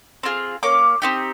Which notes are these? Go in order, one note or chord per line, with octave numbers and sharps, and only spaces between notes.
C4 F4 G#4
A#3 C#4 D6
C4 D#4 G4